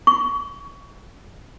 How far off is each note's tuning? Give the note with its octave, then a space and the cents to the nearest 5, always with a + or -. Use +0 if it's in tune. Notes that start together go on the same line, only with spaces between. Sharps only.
C#6 +25